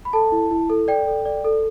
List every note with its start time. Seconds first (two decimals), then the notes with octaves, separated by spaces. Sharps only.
0.05 B5
0.13 A4 A5
0.32 E4
0.51 E4
0.70 A4
0.88 D5 G5
1.06 A4
1.25 D5
1.45 A4